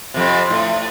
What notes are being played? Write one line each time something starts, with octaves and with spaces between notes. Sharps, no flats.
F2 C3
A2